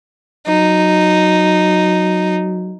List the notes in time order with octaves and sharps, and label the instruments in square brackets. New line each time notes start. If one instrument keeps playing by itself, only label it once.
[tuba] F#3 [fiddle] D#4